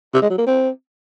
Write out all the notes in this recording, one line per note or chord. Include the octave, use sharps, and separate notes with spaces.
C3
G#3
F#3
A#3
C4